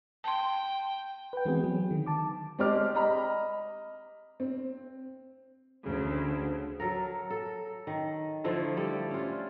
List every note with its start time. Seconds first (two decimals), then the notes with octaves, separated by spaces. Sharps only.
0.24 G5 A5 C6
1.33 B4 G5
1.45 E3 G#3 B3 C4 F#4 G#4
1.64 F#3
1.91 D3 D#3
2.06 A5 D6
2.59 G#3 C4 G4 D5 D6 F6
2.95 D#5 A#5 B5
4.40 C4
5.83 D2 C#3
6.80 F#3 A4 A#4
7.30 A4
7.87 D#3
8.44 D3 F3 A3 E4
8.77 G3 G4 A4 D5
9.10 C#4 F4